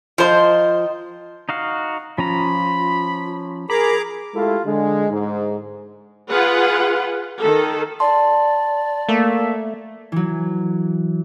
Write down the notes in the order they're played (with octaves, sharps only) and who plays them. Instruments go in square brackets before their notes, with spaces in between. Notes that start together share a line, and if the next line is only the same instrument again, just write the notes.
[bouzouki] D#3 D#4 [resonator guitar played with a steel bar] F3 C5
[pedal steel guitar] D#4 F#4 F5
[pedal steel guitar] F3 C#4 A#5 [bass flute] F4 [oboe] B5
[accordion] G#4 A#5 D6 [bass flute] A#4 [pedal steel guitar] B5
[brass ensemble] G#3 A3 E4 F4 G4 A4
D3 G#3
G#2
[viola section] F4 G#4 B4 F#5
D#3 A4
[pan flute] D5 [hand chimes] A5 C6
[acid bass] A3 [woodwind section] A#3 E5
[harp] E3 F#3